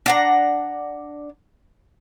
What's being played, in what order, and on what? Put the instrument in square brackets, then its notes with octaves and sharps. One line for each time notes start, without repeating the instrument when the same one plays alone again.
[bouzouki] D4 F#5 A#5